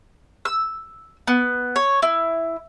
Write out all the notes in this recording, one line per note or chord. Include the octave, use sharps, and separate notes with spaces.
E6
B3
C#5
E4